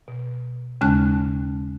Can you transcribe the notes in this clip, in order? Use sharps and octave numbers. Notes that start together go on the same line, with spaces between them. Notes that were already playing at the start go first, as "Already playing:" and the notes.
B2
D#2 C#3 G#3 C#4 A5 F#6